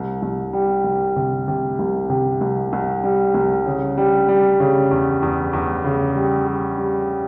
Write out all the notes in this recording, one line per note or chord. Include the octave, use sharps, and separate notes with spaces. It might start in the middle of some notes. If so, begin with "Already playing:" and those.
Already playing: C2
C2
G3
C2
C3
C3
C2
C3
C2
C2
G3
C2
C#3
G3
G3
C#3
E2
E2
E2
C#3
G3
G3
G3